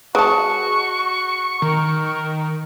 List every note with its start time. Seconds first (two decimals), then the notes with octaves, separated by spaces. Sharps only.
0.15 G#3 F#4 A5 C#6
1.62 D#3 A#4